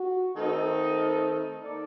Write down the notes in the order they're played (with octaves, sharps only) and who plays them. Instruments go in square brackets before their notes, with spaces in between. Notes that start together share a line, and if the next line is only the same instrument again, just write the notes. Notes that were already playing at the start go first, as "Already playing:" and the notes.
Already playing: [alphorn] F#4
[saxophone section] D#3 A3 C4 D#4 A4
A#3 D#4 A4 D5